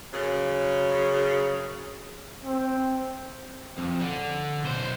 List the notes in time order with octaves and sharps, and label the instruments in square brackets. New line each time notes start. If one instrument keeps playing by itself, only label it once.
[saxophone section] F#2 C#3
[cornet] C4
[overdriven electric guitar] F2
D3
B1 C5